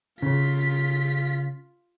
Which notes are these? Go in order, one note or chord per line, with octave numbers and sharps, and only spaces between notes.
C#3 F4 B6